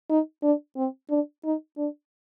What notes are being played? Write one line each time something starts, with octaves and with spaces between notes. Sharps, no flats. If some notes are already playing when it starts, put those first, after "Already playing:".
D#4
D4
C4
D4
D#4
D4